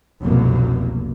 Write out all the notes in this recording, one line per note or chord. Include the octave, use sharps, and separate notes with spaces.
F1 C2 F#2 B2 A#3